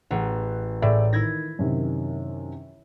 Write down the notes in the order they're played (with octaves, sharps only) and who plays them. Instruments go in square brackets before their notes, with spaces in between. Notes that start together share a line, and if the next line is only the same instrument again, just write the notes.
[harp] A1 [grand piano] G#4 F#5
[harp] A2 [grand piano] G#4 D5 E5
[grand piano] D#3 [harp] E4 G#6 A#6
[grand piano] F#2 C3 D#3